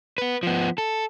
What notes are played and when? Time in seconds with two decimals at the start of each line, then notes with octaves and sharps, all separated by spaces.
0.18 B3 B4
0.43 F3 B3
0.78 A4